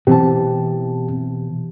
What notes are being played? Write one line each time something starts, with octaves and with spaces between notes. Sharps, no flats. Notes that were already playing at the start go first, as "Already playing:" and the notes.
B2 E3 C4 G4 A5